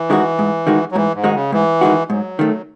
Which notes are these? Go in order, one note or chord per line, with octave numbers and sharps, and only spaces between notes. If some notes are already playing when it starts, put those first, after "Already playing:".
Already playing: E3
D#3 G#3 D#4 F#4
G#2
D#3 G#3 D#4 F#4
F#3
G#2 E3
G#2
D#3 G#3 D#4 F#4
C#3
G#2 E3
D#3 G#3 D#4 F#4
G#2 F#3
D#3 A3